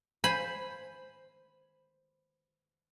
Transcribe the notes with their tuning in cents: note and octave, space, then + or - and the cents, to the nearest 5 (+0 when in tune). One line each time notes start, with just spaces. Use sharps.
C5 +0 G#5 +0 B5 +0